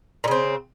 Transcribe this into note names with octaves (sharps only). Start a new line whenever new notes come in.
A#2 C#3 C4